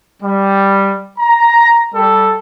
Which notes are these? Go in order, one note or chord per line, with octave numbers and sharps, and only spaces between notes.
G3
A#5
G3 A4